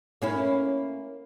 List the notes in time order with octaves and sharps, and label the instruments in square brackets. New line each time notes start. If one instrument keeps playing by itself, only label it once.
[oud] A#3 C#4 E4